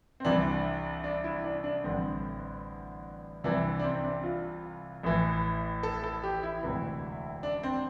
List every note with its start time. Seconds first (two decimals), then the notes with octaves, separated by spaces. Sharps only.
0.20 C4
0.25 C2 C3 E3 D4
1.04 D4
1.24 E4
1.44 D4
1.64 D4
1.84 A1 G2 D3 C4
3.44 C2 C3 E3 D4
3.79 D4
3.84 C4
3.95 C4
4.04 D4
4.23 F4
5.03 A1 A2 E3
5.83 A4
6.04 A4
6.24 G4
6.43 E4
6.63 E1 D2 C3 E3
7.43 D4
7.63 C4